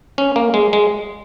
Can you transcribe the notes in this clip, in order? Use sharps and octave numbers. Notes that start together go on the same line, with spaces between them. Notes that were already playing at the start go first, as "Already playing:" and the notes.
C#4
A#3
G#3
G#3